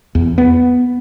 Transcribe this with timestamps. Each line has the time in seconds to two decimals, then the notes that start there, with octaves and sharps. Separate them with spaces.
0.15 E2
0.38 B3